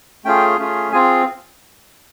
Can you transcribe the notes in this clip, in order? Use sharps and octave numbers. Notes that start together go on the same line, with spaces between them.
A3 C#4 F4 G#4 G5
A3 C#4 F4 G#4
C4 F4 G#4 G#5